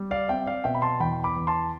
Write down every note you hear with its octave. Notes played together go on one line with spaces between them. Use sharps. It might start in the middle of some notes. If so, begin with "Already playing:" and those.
Already playing: G3
D5 F5
C4 E5 G5
D5 F5
B2 E5 G5
B5
A5 C6
E2 G5 B5
B5 D6
E2
A5 C6